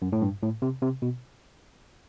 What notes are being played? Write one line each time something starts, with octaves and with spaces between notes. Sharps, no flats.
F#2
A2
G2
A2
C3
C3
B2